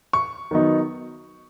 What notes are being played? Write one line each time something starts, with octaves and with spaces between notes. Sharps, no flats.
C#6
D#3 F#3 B3 D#4